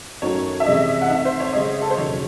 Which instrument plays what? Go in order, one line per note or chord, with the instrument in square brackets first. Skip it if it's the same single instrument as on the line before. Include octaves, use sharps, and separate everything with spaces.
[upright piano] F#2 D#3 A3 C#4 F#4 [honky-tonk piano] C#5
[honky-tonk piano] E5
[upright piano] C3 E3 G#3 C#4 G#4 [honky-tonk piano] D#5
[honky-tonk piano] F#5
[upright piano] D#3 A3 C4 [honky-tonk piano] E5
[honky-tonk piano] C5
C#5
[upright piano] C#3 G#3 C#4 [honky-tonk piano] D#5
[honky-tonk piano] A4
C5
[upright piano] E1 D#2 C#3 F#3 [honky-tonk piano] C#5